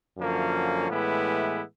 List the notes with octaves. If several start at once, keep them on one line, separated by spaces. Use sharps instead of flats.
F#2 D3 F3 A#3 C#4
A2 E3 G#3 B3 E4